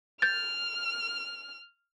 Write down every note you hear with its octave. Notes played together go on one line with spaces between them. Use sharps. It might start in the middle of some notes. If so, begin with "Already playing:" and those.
F6 G6 A6